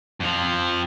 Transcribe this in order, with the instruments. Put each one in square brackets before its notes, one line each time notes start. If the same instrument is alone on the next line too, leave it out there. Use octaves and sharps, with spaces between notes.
[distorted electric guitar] F2 F3